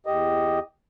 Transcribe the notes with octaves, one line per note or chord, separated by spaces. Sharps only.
E2 G4 D#5